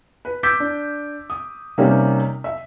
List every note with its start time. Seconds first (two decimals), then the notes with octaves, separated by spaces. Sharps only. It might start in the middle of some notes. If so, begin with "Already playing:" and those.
0.25 B4
0.43 D6 E6 G6 B6
0.60 D4
1.30 D#6
1.78 C3 G3 A#3 C#4 D#4 G4
2.44 E5